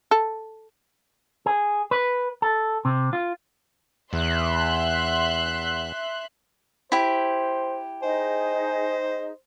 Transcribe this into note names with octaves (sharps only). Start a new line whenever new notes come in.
A4
G#4
B4
A4
C3
F4
E2 E5 C6 F#6
E4 G4 C5
D#4 G#4 C5 D#5 G#5